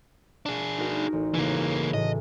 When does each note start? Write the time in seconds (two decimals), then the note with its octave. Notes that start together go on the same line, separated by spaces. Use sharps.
0.46 D4 G#4
0.78 D#4 F#4 A#4
1.13 A1
1.34 C#3 E3 A#3
1.94 A2 E3 D#5